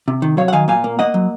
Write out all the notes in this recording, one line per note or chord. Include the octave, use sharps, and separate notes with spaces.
C3
D#3
F#3 C#5 F5
F#5
D#3 F5 G#5
A#2 F5 G#5
A#3
A#3 D#5 F#5
F#3